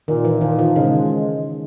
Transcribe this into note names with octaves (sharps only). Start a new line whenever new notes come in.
A#2 D#3
E3
D#3 F3
D#3
C#3 G#3